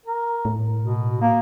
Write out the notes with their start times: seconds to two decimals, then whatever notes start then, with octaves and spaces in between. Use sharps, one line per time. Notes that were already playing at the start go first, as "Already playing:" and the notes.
0.06 A#4
0.45 A2
0.81 B2
1.21 A#3